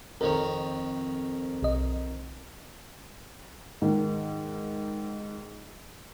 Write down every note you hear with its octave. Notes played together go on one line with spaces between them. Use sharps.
F2 D#3 A#4 C#5
B1 D#5
G#2 D#3